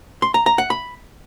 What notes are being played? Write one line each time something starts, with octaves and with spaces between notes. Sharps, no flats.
C6
A#5
A#5
F#5
B5